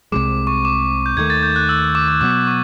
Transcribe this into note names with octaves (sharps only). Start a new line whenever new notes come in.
C2 C3 F3 G#3 D6
C#6
D6
G6
D#2 D#3 F#3 A3 G#6
A6
G6
F#6
E6
D6
D6
B2 F#3 B3 D6
C#6